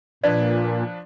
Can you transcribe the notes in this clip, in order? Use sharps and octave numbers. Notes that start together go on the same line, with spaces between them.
A#2 F3 D4 B4 D5